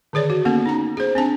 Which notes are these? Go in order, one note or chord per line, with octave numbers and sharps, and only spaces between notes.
D3 D#3 G#4 C#5 D5
F#4
A#3 B3 C#4 A4
D#4 A#5
G#4 C5
C4 D4 A5